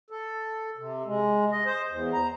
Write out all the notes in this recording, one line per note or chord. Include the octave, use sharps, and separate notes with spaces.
A4
C3
G#3
D#5
C5
E2
A#5